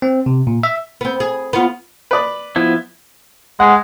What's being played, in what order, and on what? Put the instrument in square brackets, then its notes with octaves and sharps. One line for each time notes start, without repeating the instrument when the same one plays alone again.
[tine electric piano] C4
C3
A#2
E5
[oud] B3 C4
G#4
B3 F4
[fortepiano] B4 D5
[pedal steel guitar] F3 B3 E4
[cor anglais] G#3 [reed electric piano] F#5